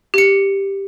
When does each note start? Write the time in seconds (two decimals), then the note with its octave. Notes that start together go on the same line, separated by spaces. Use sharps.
0.14 G4 C#7